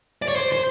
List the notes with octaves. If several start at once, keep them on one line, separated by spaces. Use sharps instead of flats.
D5
C#5
C5
C5